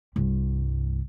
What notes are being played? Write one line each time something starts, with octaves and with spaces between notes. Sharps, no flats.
C2 G2